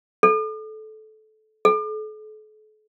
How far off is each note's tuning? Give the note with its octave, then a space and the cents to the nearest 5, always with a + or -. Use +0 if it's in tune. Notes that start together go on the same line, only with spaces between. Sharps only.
A4 -20
A4 -40